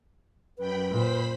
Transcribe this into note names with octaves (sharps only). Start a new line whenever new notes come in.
F#2 B4 G5 B5
A#2 C5 B5 B6